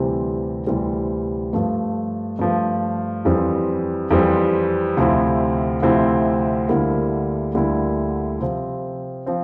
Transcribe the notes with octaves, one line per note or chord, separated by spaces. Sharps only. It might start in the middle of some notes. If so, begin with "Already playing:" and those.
Already playing: D2 C3 E3 G3 C4
D2 C3 E3 G3 C4
G2 F3 A3
G2 F3 A3
F2 E3 G3 C4
F2 E3 G3 C4
D2 C3 F3 C4 E4
D2 C3 F3 C4 E4
D2 D3 G3 A#3 E4
D2 D3 G3 A#3 E4
C3 F3 C4
F3 C4